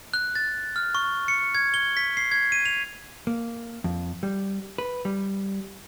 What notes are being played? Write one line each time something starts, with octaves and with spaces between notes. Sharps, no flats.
F#6
A6
F6
C#6
C#7
G#6
G7
B6
C7
G#6
D#7
F7
A#3
F2
G3
B4
G3